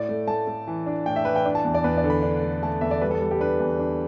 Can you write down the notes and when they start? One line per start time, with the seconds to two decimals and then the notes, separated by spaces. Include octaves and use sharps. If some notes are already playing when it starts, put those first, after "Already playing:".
Already playing: A2 D5
0.09 A3
0.27 A3 A5
0.47 A3
0.68 E3
0.86 D4
1.06 A2 G5
1.16 E5
1.25 E3 B4
1.36 G5
1.45 D4
1.55 A5
1.65 E2
1.75 D5
1.84 E2 B4
1.98 D5
2.04 D3
2.10 B5
2.23 D4
2.42 A3
2.62 A3 A5
2.81 E2 E5
2.91 D5
3.02 G3 B4
3.11 A4
3.21 G3
3.31 G4
3.40 D4 B4
3.60 E2
3.79 D4